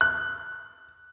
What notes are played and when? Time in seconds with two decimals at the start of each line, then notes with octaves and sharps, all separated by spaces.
0.01 F#6